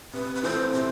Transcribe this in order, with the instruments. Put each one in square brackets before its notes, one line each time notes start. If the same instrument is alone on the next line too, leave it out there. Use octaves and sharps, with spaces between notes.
[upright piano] C3 [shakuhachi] B4
[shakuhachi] B4
[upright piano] E3 A3 C4 F4 [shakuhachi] C5
[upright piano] C3 [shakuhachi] C5